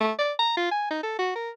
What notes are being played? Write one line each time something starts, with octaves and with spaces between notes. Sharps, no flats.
A3
D5
A#5
F4
G#5
D#4
A4
F#4
A#4